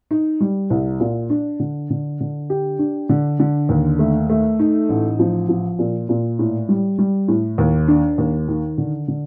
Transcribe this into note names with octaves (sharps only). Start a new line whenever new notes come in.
D#4
G3
C2
A#2
D4
D3
D3
D3
G4
D4
D3
D3
D#2
A3
A3
D#4
A1
F3
F3
A#2
A#2
A2
G3
G3
A2
D#2
D4
D#2
D#3
D3
D3